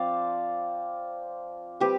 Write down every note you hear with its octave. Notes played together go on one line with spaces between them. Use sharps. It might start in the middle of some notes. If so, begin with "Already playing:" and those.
Already playing: F3 C4 F4 D5 F5
G3 C4 G4 B4